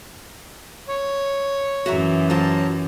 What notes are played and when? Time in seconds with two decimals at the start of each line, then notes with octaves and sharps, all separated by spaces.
0.88 C#5
1.86 F#2 E3 F#4 E5 A#5
2.30 F#3 F4 C5 A5 A#5